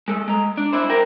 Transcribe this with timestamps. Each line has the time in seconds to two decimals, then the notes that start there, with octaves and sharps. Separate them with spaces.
0.08 G#3 A4
0.28 G#3 A#5
0.57 D4
0.73 D4 E4 C5
0.89 A#4 C5 G5